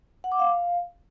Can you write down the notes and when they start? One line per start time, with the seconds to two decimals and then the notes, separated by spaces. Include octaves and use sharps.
0.24 F#5
0.32 D6
0.39 F5